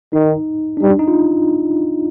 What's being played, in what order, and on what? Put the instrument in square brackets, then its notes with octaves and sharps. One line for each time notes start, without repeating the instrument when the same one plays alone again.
[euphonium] D#3 [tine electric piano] D#4
[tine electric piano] D4
[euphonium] G3 [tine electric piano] D#4
[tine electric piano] D4
D#4
F4